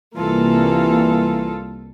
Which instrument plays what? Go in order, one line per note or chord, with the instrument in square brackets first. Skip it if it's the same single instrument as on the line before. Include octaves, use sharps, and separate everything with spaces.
[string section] C2 A#3 [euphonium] E3 [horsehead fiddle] F4 A4